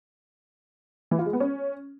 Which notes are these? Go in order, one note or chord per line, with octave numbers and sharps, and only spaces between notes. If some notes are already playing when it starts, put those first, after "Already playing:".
E3
F4
G#3
B3
C#4